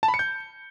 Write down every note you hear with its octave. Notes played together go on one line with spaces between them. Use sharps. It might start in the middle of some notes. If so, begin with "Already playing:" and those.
A5
B5
C#7
G6